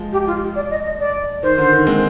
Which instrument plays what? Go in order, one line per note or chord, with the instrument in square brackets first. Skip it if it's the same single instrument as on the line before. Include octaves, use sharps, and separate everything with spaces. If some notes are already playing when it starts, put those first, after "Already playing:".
Already playing: [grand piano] F3 G#3
[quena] G4
F4
D5
D#5
D#5
D5
[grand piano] D#3 [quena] C5
[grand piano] D3
D#3
G#3 C4